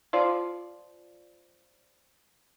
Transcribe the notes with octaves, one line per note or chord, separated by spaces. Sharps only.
F3 F4 D5